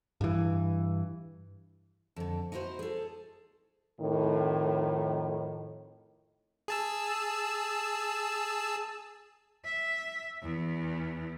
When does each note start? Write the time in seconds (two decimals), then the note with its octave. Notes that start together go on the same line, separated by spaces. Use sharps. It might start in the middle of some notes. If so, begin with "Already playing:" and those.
0.21 G2 E3
2.16 F2 D3
2.52 D#4 E4 F#4 G4 C5
2.79 G#4 A4
4.00 F2 A2 D#3
6.68 G#4 A5 E6
9.64 E5
10.42 E2